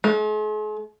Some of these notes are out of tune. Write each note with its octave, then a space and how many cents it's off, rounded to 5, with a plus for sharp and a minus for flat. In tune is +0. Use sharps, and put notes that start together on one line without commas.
G#3 +45